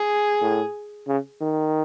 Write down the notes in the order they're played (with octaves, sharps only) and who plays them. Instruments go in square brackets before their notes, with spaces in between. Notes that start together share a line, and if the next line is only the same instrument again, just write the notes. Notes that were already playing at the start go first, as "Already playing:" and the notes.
Already playing: [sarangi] G#4
[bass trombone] A2
C#3
D#3